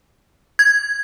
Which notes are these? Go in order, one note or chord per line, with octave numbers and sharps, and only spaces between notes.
G#6